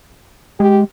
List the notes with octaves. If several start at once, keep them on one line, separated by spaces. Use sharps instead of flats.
G#3 G4